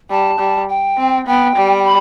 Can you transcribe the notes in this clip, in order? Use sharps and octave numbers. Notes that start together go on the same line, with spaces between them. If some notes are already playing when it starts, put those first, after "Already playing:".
G3 A5
G3
G5
C4
B3 G5
G3
B5